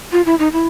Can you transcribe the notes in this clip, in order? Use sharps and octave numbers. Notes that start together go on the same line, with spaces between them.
F4
E4
D#4
E4